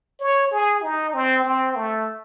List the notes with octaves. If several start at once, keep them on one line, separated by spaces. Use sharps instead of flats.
C#5
G#4
D#4
C4
C4
A3